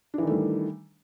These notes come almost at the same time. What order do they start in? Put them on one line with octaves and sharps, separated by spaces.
D4 E3 D#3 A3 G3